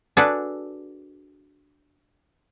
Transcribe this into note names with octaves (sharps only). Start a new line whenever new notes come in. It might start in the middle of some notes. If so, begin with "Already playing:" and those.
D4 F#4 G#4 A4 B4 D5